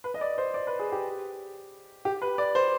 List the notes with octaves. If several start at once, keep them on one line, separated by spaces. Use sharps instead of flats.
B4
D#5
D5
C5
D5
B4
G#4
G4
G4
B4
D5
C5